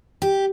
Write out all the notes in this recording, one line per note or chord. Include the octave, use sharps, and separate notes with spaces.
G4